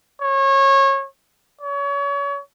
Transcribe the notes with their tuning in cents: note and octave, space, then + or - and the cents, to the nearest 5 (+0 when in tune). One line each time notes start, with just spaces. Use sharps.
C#5 -25
C#5 +30